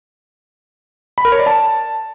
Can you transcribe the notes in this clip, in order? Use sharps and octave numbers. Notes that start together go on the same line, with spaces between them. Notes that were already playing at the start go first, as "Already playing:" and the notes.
B5
A#4
C#5
D5
A5